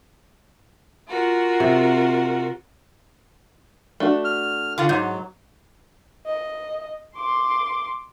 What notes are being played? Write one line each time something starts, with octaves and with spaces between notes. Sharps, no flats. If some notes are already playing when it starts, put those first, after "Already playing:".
F4 F#4 A#4
C3
A3 D4 F#4
F6
D3 F4
G#2 F#3
D#5
C6 D6